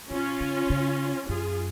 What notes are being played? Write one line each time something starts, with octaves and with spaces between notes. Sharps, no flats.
B2 C#4 F4
C#3
C#3
F#2 F4 G#4